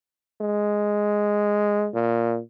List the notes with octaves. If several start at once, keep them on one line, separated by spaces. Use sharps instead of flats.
G#3
A#2